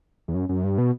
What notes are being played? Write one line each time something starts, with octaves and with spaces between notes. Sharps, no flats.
E2
F#2
F#2
G2
B2